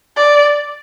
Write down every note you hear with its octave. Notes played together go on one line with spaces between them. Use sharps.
D5